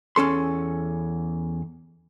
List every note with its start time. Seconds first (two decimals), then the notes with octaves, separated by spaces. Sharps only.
0.16 E2 C#4 A4 C6